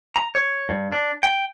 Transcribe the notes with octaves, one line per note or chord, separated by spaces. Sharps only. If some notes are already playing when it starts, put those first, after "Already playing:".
A#5
C#5
G2
D4
G5